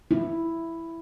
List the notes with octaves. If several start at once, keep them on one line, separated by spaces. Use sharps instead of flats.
E4